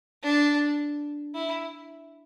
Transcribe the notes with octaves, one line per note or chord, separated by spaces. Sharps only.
D4
E4